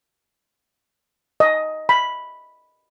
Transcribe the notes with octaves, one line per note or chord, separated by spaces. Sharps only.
D#5
B5